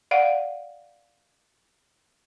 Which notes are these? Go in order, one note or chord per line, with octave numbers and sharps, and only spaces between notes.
D5 F5 F#5